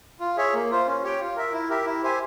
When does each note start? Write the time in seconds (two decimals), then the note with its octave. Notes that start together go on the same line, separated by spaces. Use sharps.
0.20 F4
0.37 G#4 C#5 E5
0.54 A#3
0.70 F4 C5
0.86 C#4
1.04 G4 C#5 G5
1.20 F4
1.36 A#4 E5
1.52 E4
1.69 G4 A#4 E5
1.86 E4
2.03 G4 C5 E5 G#5